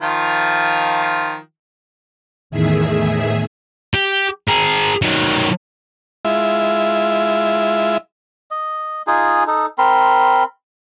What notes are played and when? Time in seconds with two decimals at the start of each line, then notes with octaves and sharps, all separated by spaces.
0.01 D#3 F3 F4
2.50 E2 A2 D#3 G#4 E5
3.94 G4
4.48 G#4 A#4
5.02 D#3 F#3
6.25 G#3 E4 F4 E5
8.51 D#5
9.07 D#4 F4 G#4 G#5
9.47 D#4 A4
9.78 C4 A#4 B5 C6